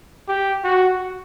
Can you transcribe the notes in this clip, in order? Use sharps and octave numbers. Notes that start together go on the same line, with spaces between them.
G4
F#4